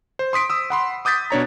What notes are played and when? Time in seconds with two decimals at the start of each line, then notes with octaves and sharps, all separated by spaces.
0.19 C5
0.33 C6 D#6 B6 D7
0.50 D#6 E6
0.70 F#5 B5 C6
1.05 D6 D#6 G6 A6 B6
1.30 B2 D4 C#5 A#5